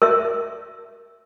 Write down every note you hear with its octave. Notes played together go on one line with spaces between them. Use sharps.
A#4 E5